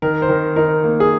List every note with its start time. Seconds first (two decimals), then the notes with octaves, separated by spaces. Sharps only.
0.02 D#3 A#4
0.22 C5
0.29 D#3 A#4
0.56 D#4 A#4
0.84 A#3
1.00 G#4